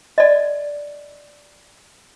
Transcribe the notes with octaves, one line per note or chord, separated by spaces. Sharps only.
D5 D#5